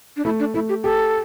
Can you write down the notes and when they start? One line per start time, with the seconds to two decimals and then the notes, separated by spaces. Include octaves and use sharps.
0.17 D4
0.25 A3 E4
0.40 D4
0.54 A3 E4
0.69 G4
0.83 G4 A4